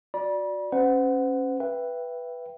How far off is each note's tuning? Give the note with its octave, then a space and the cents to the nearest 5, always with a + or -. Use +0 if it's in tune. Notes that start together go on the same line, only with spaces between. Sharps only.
F#4 -20 D5 +0 B5 -45
C#4 -20 C5 -40 F#5 +0
B4 +0 E5 +25 G5 +0